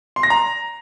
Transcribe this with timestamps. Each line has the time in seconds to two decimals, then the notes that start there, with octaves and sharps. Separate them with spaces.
0.16 C6
0.23 A#6
0.30 A#5